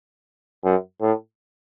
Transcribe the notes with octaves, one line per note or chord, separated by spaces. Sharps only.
F#2
A2